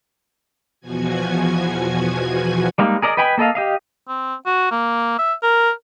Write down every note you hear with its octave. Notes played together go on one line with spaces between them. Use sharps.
E2 B2 F3 F#4 G#5 G#6
G3 G#3 A#3 D#4
G#4 A#4 D5 D#5
B4 D#5 G5 G#5 B5
A#3 A4 D#5 F5
G4 D#5 F5
C4
F#4
A#3
E5
A#4